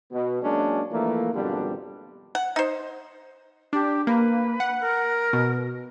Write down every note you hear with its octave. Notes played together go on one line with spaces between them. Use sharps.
B2
F#3 G#3 A#3 C#4 D4
E3 F3 A3 A#3
G#1 F2 B2 D3 G3 D4
F#5
D#4 C5
D4 G4
A#3 B4
F#5
A#4
B2